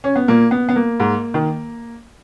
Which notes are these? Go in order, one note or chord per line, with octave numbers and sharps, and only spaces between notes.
C#4
B3
A#2 A#3
B3
B3
A#3
G#2
D#3